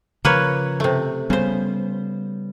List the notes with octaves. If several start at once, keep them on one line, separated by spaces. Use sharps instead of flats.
C#3 F3 A#3 B4 C#5
C3 A3
C#3 G3 B3 C5